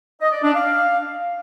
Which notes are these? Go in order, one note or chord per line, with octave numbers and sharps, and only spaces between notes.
D#5
D5
D4
F5